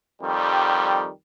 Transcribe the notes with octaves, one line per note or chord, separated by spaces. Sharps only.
F2 D#3 G3